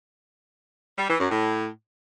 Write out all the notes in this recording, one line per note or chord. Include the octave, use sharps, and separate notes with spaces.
G3
E3
F#2
A2